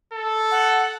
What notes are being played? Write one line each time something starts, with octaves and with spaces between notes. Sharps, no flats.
A4
F#5